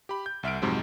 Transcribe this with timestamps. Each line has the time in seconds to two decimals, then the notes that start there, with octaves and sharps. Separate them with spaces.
0.09 G4 B5
0.26 G6
0.43 C2 E5 F6 D7
0.62 F2 G#2 C3 F#3 G#3